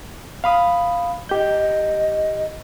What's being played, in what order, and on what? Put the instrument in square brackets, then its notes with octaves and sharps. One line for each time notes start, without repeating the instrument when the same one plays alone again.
[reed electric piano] F5 B5 D#6
[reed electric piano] G4 G6 [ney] D#5